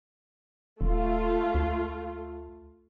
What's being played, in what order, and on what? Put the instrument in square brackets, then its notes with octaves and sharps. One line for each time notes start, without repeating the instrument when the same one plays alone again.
[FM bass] D#1 [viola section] A3 F4
[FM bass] D2